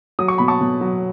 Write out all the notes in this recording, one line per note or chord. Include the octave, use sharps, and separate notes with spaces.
F#3 D#6
C#6
B2 B5
A5 C#6
B2
F#3